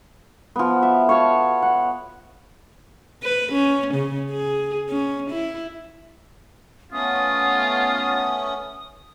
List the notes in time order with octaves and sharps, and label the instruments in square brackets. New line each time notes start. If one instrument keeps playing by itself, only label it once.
[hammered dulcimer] F3 B3
E5
C#5 F5 A5
F#5
[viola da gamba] B4
C#4
C#3
G#4
C#4
E4
[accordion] A3 B3 C#4 [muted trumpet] F4 [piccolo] D#6